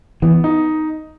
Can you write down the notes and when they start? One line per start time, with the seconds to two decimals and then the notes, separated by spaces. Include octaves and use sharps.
0.22 E3 B3
0.44 D#4